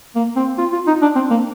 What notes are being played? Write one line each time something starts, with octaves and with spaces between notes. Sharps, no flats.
A#3
C4
F4
F4
D#4
D4
C4
A#3